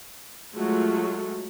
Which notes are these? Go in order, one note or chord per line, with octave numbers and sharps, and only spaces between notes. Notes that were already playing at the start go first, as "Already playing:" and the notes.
F#3 G#3 A3 F4 F#4